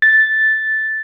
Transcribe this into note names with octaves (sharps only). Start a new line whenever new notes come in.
A6